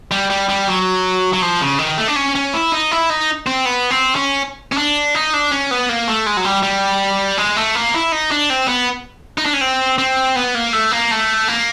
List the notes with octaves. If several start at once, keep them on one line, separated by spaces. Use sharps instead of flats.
G3
G3
G3
F#3
F#3
F3
C#3
D#3
A3
D4
C#4
C#4
E4
D#4
E4
D#4
C4
B3
C4
C#4
C#4
D4
D#4
D4
C#4
B3
A#3
A3
G#3
F#3
G3
G3
G#3
A3
A#3
E4
D#4
D4
C4
B3
D#4
D4
C#4
C4
C4
B3
A#3
A3
A#3
A3
A#3